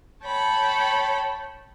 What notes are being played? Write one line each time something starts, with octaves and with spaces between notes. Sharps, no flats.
C#5 G5 A5 B5